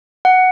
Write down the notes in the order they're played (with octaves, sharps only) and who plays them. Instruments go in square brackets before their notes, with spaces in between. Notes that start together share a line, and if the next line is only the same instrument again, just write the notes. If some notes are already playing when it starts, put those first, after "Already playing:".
[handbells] F#5